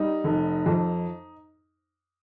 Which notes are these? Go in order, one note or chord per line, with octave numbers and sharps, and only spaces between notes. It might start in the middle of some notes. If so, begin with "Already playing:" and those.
Already playing: G3 D#4
F1
F2